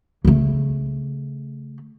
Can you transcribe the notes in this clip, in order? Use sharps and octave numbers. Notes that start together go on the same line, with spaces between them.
C#3 A3